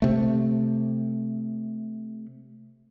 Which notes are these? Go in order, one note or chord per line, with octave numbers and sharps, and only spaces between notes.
C3 A3